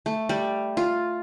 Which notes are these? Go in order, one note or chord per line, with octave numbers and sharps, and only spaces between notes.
A3
G3
F4